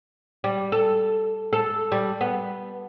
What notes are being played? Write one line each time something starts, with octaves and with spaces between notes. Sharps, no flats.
G3
A4
A4
G3
B3